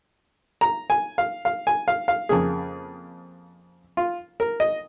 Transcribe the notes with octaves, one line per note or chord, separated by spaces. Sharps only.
A#5
G#5
F5
F5
G#5
F5
F5
F2 C#3 A#3 G#4
F4
A#4
D#5